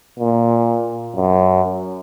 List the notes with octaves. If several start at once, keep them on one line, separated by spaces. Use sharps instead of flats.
A#2
F#2